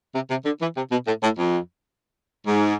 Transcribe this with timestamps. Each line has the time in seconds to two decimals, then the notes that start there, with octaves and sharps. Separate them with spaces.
0.14 C3
0.30 C3
0.45 D3
0.61 E3
0.76 C3
0.91 B2
1.06 A2
1.23 A2
1.39 F2
2.46 G#2